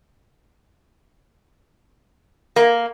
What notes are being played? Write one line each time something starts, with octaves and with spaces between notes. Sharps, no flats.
A#3